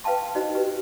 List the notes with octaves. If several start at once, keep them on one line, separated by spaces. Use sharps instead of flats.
B4 F5 G5 A5 C6
D#4 F#4 C5 D#5
G4 B4